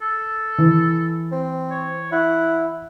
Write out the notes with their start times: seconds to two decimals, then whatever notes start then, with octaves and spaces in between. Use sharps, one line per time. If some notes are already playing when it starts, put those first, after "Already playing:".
0.02 A4
0.58 E3
1.32 C4
1.71 C#5
2.12 E4 F#5